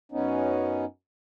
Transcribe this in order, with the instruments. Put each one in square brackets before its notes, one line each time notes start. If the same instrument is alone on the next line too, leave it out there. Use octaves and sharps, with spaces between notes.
[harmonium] F#2 B3 C#4 D#4